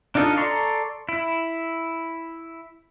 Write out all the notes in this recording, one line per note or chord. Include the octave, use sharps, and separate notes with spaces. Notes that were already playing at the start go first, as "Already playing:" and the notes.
D4 D#4 F4 A4 D#5
A4 D5 A#5 C6 C#6
E4